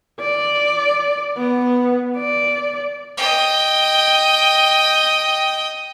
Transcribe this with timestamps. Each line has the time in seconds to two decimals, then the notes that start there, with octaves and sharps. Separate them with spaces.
0.20 D5
1.37 B3
2.17 D5
3.17 D#5 G5